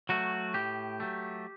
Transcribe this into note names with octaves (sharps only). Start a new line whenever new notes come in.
F#3 A3 F#4
A2 G4
F#3 A3